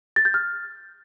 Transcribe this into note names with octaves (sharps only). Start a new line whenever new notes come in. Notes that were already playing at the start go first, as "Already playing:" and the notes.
A6
G6
F6